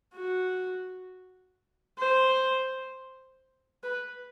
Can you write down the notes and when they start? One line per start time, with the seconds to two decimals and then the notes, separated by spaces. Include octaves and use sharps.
0.14 F#4
1.99 C5
3.83 B4